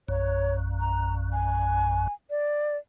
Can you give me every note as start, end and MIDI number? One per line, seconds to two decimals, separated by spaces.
0.08 2.07 34
0.08 2.07 42
0.08 0.54 73
0.80 1.15 82
1.33 2.13 80
2.30 2.77 74